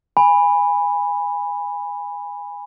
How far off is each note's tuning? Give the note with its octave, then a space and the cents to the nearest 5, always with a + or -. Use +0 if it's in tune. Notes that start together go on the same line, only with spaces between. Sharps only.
G#5 -20 B5 +0